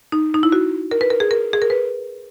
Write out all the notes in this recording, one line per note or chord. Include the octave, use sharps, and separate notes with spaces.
D#4
D#4
E4
F#4
A#4
B4
A#4
G#4
A#4
G#4
A#4
B4